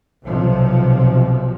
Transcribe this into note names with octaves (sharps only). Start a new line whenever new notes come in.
B1 C3 F3